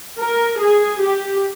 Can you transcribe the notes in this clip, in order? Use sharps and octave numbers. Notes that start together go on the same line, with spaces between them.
A#4
G#4
G4